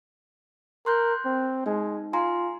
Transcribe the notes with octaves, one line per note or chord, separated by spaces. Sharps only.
A#4 C6 F#6 G6
C4
G#3 D#4
F4 G#5 A#5 C6